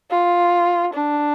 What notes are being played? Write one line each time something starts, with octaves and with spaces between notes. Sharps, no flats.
F4
D4